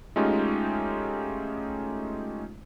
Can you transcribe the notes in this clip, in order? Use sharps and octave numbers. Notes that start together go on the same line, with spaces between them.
G#3 A3 C#4 D#4 F4 G4